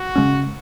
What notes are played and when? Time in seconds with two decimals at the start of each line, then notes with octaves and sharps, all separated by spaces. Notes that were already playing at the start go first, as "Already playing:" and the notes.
Already playing: F#4
0.16 C#3 G#3 C#4